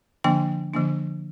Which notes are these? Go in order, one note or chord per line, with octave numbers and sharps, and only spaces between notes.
D3 F3 A#3 D4 G5
D3 F3 A#3 D4